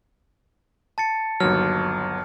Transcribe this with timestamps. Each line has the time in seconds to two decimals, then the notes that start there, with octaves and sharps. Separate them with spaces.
0.98 A5 A6 C#7
1.40 G1 D#2 F#3 F6